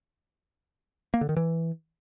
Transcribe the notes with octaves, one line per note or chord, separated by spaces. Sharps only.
A#3
D3
D#3
E3